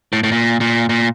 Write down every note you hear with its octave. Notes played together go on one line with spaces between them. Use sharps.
A2
A2
A#2
A#2
A#2